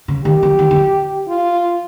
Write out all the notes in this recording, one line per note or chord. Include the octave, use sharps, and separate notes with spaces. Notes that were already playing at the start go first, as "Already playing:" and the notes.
C#3
D#3 G4
F3
D#3
D#3
F3
F4